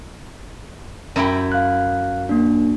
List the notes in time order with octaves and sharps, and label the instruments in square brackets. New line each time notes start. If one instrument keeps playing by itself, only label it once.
[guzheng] F#2 E4 G5
[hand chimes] F5 F#6
A#3 D4